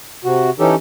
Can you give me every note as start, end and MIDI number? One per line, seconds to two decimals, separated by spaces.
0.25 0.50 48
0.25 0.50 66
0.59 0.75 52
0.59 0.75 61
0.59 0.75 63
0.59 0.75 67
0.59 0.75 69